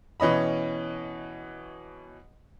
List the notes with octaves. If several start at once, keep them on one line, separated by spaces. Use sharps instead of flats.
B2 E3 C#4 D#5 B5